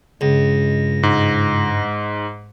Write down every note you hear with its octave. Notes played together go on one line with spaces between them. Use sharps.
C#2 G2 G#3 A#6
G#2